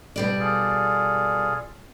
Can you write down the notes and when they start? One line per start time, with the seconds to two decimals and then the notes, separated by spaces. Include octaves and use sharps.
0.16 B2 G3 D5
0.40 F4 G#4 A4